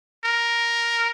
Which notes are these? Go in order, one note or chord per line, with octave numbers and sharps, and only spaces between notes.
A#4